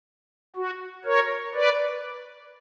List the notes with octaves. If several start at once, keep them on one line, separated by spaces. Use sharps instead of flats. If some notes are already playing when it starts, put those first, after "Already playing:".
F#4
A#4 C#5
B4 D5